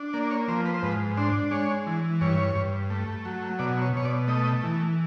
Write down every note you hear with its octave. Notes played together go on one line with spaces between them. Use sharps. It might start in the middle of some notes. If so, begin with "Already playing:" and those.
Already playing: D4
A#3 D5
C#5
F3 C5
B4
C5
G#2 B4
D4 C5
G#3 C#5
E3
G2 C#5
G2
A3
F#3
B2 D5
C#5
B2 C#5
D5
A3 D#5
E3